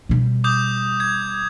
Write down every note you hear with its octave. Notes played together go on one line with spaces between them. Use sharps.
B2 G3
D6 D#6 G6
G#6